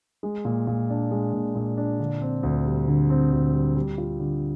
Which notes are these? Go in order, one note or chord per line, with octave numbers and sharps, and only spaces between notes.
G#3
A#2
A#2
D4
G#3
A#2
A#2
D4
D3
C4
D2
G3
D3
C4
D2
G3
G3
F4
D3